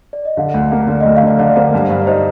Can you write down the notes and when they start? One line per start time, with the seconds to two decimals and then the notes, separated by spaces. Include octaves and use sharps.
0.13 D5
0.25 D#5
0.37 D3 F5
0.54 D2
0.72 A#3
0.88 D3
1.01 D#5
1.05 D2 D5
1.17 F5
1.22 D3
1.27 D5
1.39 D3 D5
1.51 D5
1.56 A#3 C5
1.74 G2
1.90 G2
2.02 D5
2.07 D#4 C5